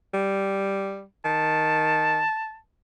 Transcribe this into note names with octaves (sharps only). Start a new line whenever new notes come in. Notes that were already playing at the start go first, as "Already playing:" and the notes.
G3
D#3 A5